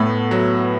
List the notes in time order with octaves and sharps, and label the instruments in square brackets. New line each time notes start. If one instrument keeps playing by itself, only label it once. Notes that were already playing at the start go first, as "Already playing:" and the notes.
Already playing: [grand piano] A2 [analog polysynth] A3 B3
[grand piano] F#3